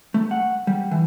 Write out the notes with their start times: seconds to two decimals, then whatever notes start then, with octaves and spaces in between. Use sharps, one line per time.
0.14 A3
0.31 F#5
0.67 G3
0.91 E3